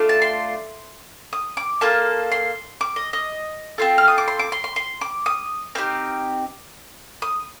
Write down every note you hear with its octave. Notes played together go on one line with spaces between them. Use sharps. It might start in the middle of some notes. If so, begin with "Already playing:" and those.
Already playing: A3 D4 F4
A5
C6
D#6
D6
A#3 F4 A4 A5
C6
D6
D#5
D#5
C4 F4 A4
F6
D#6
D6
C6
D6
C6
C6
C6
D6
D#6
C4 D#4 G4 F6
D#6